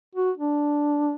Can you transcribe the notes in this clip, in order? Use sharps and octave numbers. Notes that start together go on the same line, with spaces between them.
F#4
D4